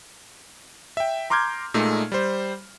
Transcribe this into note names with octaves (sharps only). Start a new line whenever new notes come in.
E5 G5
A#5 C6 D6 F6 G6 G#6
A#2 G#3 A3 D#4
G3 C5